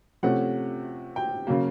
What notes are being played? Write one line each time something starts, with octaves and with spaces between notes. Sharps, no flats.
C3 F3 A3 C#4 F#5
G5
C#3 F#3 A#3